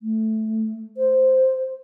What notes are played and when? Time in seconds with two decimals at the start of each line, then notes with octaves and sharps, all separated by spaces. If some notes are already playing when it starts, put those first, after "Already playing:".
0.01 A3
0.97 C5